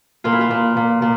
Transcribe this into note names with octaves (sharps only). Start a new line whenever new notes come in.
A#2 F4
E4
F4
A#2
A#2
A#2